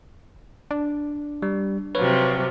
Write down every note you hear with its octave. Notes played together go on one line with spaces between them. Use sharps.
D4
G3
C3 F3 F#3 B4 C#5